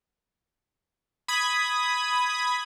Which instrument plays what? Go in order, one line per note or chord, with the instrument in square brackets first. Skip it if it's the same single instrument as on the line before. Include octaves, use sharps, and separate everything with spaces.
[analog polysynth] B5 D#6 G#6